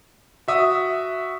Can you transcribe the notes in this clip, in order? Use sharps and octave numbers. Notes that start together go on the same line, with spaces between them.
F#4 E5 D#6